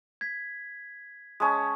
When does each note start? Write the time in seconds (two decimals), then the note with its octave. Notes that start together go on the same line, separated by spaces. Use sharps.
0.21 G#6 B6
1.40 G#3 C#4 A5 D#6